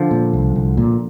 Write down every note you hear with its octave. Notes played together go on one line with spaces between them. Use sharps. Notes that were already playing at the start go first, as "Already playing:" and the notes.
Already playing: D3 F3
A#2
C2
C2
A#2